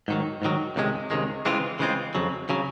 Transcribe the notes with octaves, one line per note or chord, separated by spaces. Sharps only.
G#2 D#3 F#3
G#2 D#3 F#3
C#2 C3 D#3 G#3
C#2 C3 D#3 G#3
C#3 E3 G#3 C4 F4
C#3 E3 G#3 C4 F4
F2 C#3 F#3
C#3 F#3